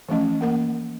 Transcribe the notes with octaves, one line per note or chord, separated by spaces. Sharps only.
E3 F3 A3 C#4 D#5
A#3 A#4 F#5